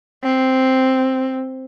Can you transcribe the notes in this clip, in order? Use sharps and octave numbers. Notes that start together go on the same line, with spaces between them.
C4